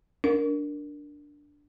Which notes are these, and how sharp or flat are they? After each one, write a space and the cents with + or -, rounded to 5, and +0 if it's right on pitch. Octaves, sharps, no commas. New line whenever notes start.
D4 +0 A#4 +0